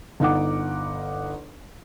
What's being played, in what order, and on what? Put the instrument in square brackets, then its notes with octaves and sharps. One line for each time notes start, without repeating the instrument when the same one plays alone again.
[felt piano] G1 D#4 F#5 D6